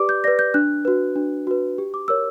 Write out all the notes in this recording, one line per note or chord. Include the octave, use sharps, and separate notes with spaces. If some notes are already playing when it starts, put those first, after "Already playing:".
Already playing: G4 B4 D5 D6
G6
B4 D5 A#6
G6
D4 F#6
F#4 B4
D4
F#4 B4
G4
D6
A#4 C#5 E6